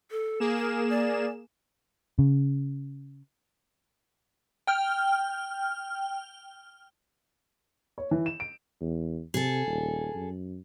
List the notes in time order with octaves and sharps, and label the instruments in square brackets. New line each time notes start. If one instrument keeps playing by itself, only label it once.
[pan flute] A4
[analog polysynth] A#3 G#4 E7
[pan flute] A#4
D5
[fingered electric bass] C#3
[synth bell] G5 F6
[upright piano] C#5
E3
E7
D7
[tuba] E2
[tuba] C3 [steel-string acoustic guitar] G#4 A4
[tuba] D#1
F#2